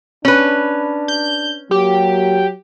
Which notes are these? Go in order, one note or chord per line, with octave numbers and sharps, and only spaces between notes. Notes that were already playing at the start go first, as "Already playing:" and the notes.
C#4 D4 B4
G6
F#3 A#3 G4